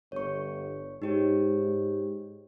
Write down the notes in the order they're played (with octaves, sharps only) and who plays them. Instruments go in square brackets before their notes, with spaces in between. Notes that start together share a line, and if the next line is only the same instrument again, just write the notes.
[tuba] G1 [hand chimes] C#5 C#6
[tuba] G#2 [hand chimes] D#4 G4 C#5